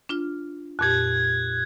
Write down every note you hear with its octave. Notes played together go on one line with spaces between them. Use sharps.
D4 F4 F6
F2 A#2 G4 F#6 G#6